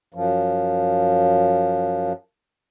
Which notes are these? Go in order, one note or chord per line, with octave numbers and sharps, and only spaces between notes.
F#2 F3